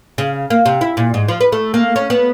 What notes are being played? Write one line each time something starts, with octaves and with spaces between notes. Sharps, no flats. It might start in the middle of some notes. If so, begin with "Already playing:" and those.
C#3
A#3
C3
E4
A#2
G#2
F3
B4
A3
A#3
C#4
B3